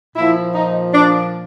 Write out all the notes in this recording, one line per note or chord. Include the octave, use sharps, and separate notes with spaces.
A#2 F3 E4
D#4
D4